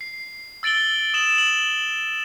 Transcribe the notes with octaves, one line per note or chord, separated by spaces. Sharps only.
C7
E6 A6 D7 F#7 G7
D#6 E7 F#7
F#7